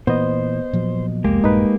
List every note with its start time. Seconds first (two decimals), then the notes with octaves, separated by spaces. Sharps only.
0.07 A#2 E3 B3 C5 D#5
0.73 A#2 F3 F#3
1.24 C2 F2 G#3 A#3 G4
1.44 A#1 G2 D#4 B4